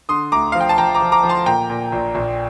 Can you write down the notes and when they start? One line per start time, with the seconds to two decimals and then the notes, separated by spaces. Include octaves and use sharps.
0.09 D3 C6 D#6
0.32 D2 A#5 D6
0.52 F3 F5
0.61 G5
0.69 A5
0.78 F3 G5 A#5
0.94 A#5 D6
1.01 F3
1.12 A#5 D6
1.23 F3
1.29 A5 C6
1.46 A#2 G5 A#5
1.69 A#2
1.92 A#1
2.15 A#1